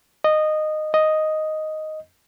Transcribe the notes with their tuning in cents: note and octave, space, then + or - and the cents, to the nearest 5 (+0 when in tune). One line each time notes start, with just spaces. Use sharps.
D#5 -15
D#5 +0